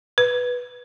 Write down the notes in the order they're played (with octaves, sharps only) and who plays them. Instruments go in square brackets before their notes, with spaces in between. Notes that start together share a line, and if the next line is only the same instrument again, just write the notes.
[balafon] B4